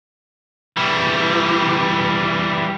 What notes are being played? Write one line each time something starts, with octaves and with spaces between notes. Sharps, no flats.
E3 G3